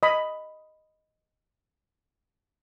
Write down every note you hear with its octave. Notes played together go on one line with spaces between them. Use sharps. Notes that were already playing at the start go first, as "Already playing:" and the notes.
D#5 B5